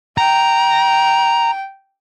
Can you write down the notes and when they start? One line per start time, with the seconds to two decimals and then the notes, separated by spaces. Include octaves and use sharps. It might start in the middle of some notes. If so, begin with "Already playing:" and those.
0.18 G5 A#5